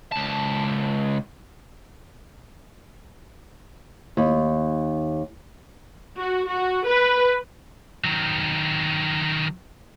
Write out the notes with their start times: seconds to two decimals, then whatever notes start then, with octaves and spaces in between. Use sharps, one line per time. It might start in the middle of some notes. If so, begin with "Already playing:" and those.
0.12 C#2 A5
4.17 D#2
6.19 F#4
6.50 F#4
6.88 B4
8.04 D#3 F#3